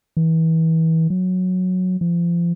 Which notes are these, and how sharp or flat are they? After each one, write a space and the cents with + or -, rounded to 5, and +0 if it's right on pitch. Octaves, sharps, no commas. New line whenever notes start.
E3 -30
F#3 -10
F3 -30